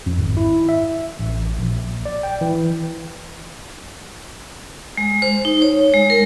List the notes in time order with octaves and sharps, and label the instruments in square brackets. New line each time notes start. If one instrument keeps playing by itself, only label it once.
[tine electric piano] F2
G#1
E4
E5
A1
A#1
D5
G5
E3
[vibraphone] G#3
C5
D#4
C#5
G#3
A#4